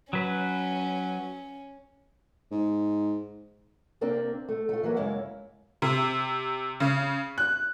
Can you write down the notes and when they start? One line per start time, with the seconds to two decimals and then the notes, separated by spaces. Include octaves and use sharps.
0.13 F#3 C#4 B4
2.51 G#2
4.01 C3 A#3 C4 D4
4.48 A3
4.69 A3 F4
4.83 E3 F#3 A#3
4.96 F#2 C#3 G#3 E4 F5
5.82 C3
6.80 C#3
7.38 F#6